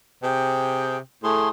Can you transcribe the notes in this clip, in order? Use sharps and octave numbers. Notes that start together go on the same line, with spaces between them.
C3 G#4 G5
A2 A3 G#4 C6